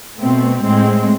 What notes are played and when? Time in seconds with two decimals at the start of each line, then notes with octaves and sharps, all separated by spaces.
0.19 B2 A3 C4
0.62 A2 G#3 C4